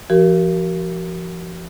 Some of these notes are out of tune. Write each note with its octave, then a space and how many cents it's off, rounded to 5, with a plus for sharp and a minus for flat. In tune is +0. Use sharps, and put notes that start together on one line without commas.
F3 -35 F#4 +40 A#4 +0